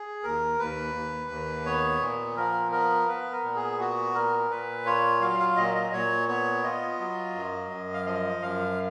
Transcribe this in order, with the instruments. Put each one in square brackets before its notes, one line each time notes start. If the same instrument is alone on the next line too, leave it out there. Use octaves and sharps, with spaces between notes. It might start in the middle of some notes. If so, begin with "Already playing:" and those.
Already playing: [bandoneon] G#4
D#2 A#4
D#2 B4
D#2
D#2
B3 C#5
A#2
F3 A#4
B3 A#4
B3 B4
A#4
A#2
G#4
B3 F#4
A#2 A#4
A#2 B4
F4 C#5
F#3 F5
F5
A#2 D#5
D#5
A#2 C#5
B3 C#5
F4 D#5
F#3
F#2
F#2
F5
F3 D#5
F#2 F5